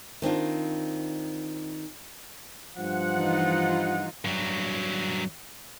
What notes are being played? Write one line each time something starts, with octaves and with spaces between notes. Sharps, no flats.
D#3 C4 D4 F4
G2 F3 F#5
E3 D#4 F4
G2 F#3